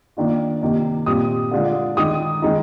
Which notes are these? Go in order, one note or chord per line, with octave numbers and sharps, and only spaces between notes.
D#3 A#3 D4 F4
C3 D#3 A#3 D#4
A#2 G3 C4 D#6
D3 G#3 D4 F4
D#3 G#3 D#4 D#6
D#3 G#3 D#4